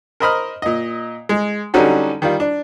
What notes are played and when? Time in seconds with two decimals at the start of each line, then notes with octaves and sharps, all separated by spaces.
0.20 A#4 C5 D#5 B5 D#6 F6
0.62 A#2 D#5
1.29 G#3
1.74 D3 F#3 G3 C#4 D#4 F#4
2.22 D#3 G3 F4
2.40 D4